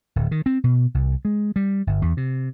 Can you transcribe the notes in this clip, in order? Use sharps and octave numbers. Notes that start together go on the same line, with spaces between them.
D1
D#3
C4
B2
C2
G#3
G3
G1
E2
C3